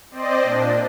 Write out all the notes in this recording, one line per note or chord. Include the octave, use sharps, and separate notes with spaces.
C4 C5 D5 D#5
A#2 D4